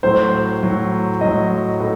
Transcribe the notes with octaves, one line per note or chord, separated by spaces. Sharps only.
A2 F#3 C5
A2 F#3
A2 F#3 D#5
A2